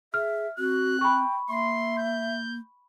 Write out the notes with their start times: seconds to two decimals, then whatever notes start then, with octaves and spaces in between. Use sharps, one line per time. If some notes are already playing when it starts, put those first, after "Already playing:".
0.14 G#4 E5 F6
0.58 C4 F#4 F#6
1.01 G5 B5 C#6
1.49 A#3 E5 C6
1.98 G6